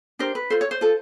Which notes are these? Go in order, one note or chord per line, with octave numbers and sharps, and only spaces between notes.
D4 G4 A#4 C5
B4
F4 A4 C5
C#5
C5
F4 A4